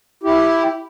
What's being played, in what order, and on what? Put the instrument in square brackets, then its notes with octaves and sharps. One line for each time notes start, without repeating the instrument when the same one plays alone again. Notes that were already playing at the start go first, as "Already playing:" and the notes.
[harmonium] E4 G4